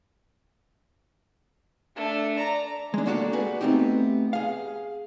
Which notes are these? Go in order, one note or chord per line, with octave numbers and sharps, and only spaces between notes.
A3 D4
D5 A#5
G#3 D4
A#3 D4 F#4 G4 A4 D5
F#4 G#4 B4
A3 B3 C4 D#4 G4
G#4 F5